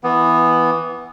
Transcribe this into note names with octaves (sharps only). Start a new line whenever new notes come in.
E3 B3